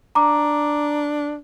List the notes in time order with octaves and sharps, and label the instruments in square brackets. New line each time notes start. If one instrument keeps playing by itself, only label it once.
[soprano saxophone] D4 [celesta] A#5 D6